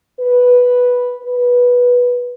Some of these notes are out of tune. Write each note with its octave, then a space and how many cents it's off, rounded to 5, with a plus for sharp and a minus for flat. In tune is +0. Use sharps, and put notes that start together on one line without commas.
B4 -5
B4 -10